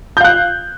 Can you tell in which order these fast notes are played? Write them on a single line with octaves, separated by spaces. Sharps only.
G6 F5 F#6